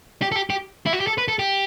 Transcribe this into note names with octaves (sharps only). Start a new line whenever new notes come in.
G4
A4
G4
G4
E4
F#4
G4
A4
B4
A4
G4